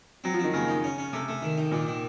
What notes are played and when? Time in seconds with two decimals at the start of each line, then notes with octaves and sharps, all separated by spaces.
0.24 F#3 C4
0.34 F3
0.39 D#3 C4
0.54 C#3 A#3
0.68 D#4
0.84 C#4
0.98 C#4
1.13 C3 A3
1.28 A3
1.42 D#3
1.58 D#4
1.72 A#2 D#3
1.86 D#3